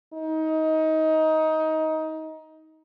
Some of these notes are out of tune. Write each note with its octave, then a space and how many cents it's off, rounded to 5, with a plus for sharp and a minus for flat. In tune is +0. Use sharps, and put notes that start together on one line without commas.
D#4 +20